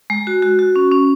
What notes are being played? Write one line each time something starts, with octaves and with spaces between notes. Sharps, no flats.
G#3
F#4
F#4
F#4
C#4
C#4